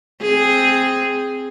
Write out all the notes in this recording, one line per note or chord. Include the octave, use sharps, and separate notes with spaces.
C4 G#4